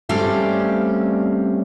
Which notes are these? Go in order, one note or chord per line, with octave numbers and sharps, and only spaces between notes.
G3 A3 C4 C#4 D5 F5